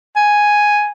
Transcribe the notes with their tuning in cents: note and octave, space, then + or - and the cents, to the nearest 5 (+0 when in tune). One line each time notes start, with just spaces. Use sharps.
G#5 +0